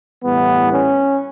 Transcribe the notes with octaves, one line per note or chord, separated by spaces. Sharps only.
A2 E3 G3 B3
C#4